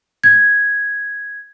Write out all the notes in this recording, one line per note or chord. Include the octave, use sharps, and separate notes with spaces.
G#6